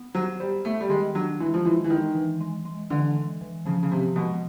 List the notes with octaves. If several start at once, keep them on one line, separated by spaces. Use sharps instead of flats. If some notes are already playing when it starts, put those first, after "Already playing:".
Already playing: B3
F#3 C5
G3 C5
A3 B3
G3
D#3 G#3
F#3 D4
E3 G#3
F3
E3 G#3
E3
D#3 G#3
E3
G#3
G#3
D3 E3
G#3
E3
C#3 F3
C#3
C3 F3
B2 G#3